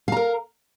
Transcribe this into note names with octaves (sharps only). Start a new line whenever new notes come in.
A#4 F5 A#5